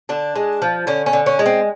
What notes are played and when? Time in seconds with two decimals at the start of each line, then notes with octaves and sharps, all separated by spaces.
0.09 D3 D4
0.35 G#3
0.62 F3
0.87 D3 C#4
1.06 C#4
1.13 D3
1.26 C#4
1.39 G#3
1.46 C4